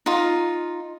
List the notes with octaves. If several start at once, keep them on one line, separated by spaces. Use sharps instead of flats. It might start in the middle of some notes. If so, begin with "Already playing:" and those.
D#4 F4